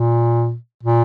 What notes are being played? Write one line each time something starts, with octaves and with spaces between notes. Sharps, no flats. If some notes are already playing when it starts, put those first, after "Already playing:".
Already playing: A#2
A#2